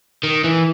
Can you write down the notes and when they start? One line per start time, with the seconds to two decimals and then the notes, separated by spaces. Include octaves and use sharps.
0.24 D#3
0.44 E3